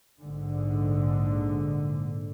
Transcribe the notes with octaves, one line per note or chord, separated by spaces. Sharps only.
A#1 G#2 D3